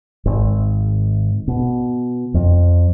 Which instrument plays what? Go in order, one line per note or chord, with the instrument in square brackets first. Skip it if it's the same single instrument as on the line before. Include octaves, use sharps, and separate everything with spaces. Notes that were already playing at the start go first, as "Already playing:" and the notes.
[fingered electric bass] G#1
B2
F2